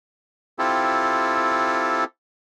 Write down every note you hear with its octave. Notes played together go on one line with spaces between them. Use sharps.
C4 E4 F4 G4 A4